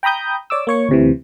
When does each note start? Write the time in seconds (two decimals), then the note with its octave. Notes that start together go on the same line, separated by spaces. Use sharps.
0.03 G5 A#5 B5 D#6 G6
0.50 C#5 D5 D6 E6
0.67 A#3 C#5 C#6
0.89 D2 C3 E3